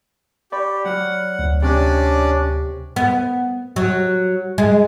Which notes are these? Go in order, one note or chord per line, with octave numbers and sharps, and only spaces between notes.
G4 D5 B5 C#6
F#3 F#5 F6
D2
C3 C#4 D4 D5
B3
F#3
G#3